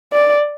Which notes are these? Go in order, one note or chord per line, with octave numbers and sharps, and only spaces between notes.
D5